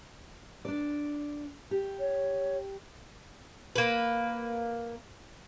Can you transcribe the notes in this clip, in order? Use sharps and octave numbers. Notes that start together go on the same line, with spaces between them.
D4 D5
G4
C#5
A#3 B4